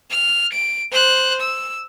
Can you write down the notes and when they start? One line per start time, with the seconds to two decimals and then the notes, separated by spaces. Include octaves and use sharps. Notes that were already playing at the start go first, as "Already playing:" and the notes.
0.10 F6
0.53 D7
0.91 C5 F#6
1.41 E6